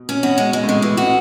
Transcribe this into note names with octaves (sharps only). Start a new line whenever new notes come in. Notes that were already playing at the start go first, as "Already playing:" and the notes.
Already playing: B2
C#4
B2 F#4
G#3
G#3
A2
B2 G#3
E3
B2 F#4